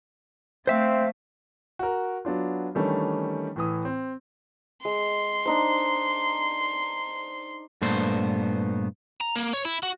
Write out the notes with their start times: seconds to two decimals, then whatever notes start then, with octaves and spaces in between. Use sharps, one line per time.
0.67 A3 C4 C5 E5 F5
1.79 F#4 A#4
2.25 F#3 B3 D4 F4
2.75 D#3 E3 G3 A3 C#4 D4
3.56 A2 E3 D#6
3.85 C4
4.85 G#3 C6
5.46 D4 D#4 C5
7.82 G2 A#2 A3 B3 C5
9.21 A#5
9.35 A#3
9.53 C#5
9.65 E4
9.83 F#4